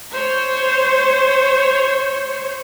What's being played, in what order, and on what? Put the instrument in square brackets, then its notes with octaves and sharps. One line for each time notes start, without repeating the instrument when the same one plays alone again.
[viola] C5 C#5